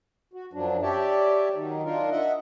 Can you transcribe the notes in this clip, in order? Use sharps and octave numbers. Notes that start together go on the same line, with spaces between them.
F#4
F#2 F3 F#3 D4
G4 C#5 D5 E5 G5 A5
D#3 F#3 D#4
D4 D#4 F4 A#4
D#5 E5 F#5